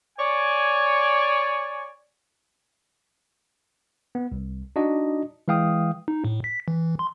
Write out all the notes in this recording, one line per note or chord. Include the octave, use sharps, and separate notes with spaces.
C#5 D5 G#5
B3
C2
D4 D#4 F#4 D#5
E3 G#3 F5 G5 D#6
D#4
A2
B6
E3
C6